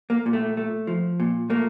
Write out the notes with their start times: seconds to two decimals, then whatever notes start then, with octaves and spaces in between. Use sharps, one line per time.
0.10 A#3
0.26 A#2
0.33 A3
0.57 A3
0.87 F3
1.20 A#2
1.50 A3 A#3